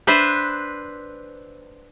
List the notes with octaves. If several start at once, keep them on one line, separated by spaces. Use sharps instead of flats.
D4 B4 C5 E5